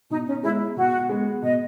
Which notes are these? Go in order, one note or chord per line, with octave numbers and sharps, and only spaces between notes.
B2 D#4
C#4
G#3 B3 E4
B2 F#4
G#3 B3
B2 D#5